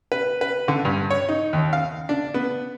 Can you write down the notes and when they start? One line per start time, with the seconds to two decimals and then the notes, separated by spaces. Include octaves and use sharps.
0.12 B4
0.41 B4
0.68 D3
0.85 G2
1.11 C#5
1.29 D#4
1.53 D#2
1.73 F5
2.09 D4
2.34 B3